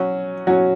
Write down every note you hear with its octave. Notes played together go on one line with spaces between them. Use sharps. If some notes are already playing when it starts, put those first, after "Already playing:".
Already playing: F#3 C#4 F#4
F#3 C#4 F#4